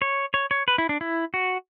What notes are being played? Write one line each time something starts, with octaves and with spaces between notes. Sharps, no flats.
C#5
C#5
C#5
B4
E4
D4
E4
F#4